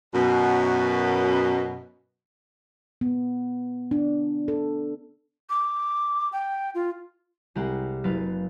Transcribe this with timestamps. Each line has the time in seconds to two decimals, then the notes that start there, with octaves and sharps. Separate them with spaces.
0.15 F#2 B2
3.01 B3
3.91 D4
4.48 A4
5.49 D6
6.32 G5
6.75 F4
7.55 C2 G#3 G4 F#5 A#5
8.04 F#1 F#3 B4 F5 A6